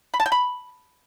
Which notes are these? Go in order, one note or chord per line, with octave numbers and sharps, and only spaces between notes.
B5
A5
G5
B5